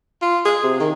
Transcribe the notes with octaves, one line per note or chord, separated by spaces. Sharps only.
F4
G#4
C3
D#3